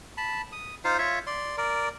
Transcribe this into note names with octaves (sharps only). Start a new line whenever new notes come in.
A5 B5
D#6
D#4 F4 C5 F5
F4 C#5 E5
D5 C6
A#4 D5